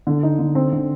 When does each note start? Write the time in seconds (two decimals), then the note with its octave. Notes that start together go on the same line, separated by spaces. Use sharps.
0.07 D3
0.23 D#4
0.39 D3
0.55 C4
0.73 D3